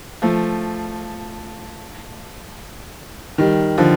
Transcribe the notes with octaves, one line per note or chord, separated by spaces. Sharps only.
F3 A3
D#3 G3
D3 F3